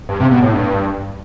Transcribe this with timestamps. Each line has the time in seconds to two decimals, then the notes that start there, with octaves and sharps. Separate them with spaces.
0.09 G2
0.20 C3
0.31 B2
0.42 A2
0.53 G2